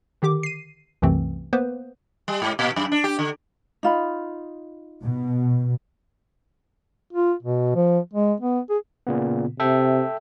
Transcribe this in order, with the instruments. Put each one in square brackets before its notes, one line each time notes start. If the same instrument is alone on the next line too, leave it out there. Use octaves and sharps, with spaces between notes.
[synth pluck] D3 D#3 G4 D6
C7 D#7
C2 F#2 C3 E3 A3 C4
A#3 B3 B4 C5
[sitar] G3
G#2
A#2
F#2
D4
G4
D3
[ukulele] D#4 F4 B5
[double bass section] B2
[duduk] F4
B2
F3
G#3
B3
G#4
[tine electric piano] A#2 C#3 B3
[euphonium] C3 [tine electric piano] A4 E5 G5